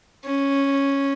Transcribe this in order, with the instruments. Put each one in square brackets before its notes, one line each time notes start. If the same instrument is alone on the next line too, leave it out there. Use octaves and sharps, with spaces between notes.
[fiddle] C#4